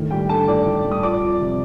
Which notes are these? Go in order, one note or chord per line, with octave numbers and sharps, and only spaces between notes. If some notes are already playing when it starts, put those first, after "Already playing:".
Already playing: A2 D#3
G3 G4 G5
D4 A4 A5
A2 D5 D6
A2
G3
D#6
F3 D5 D6
F2
C3